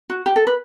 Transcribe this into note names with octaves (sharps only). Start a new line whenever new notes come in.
F#4
G4
A4
B4